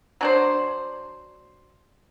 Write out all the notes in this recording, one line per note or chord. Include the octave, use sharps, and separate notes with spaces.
F#3 D4 C5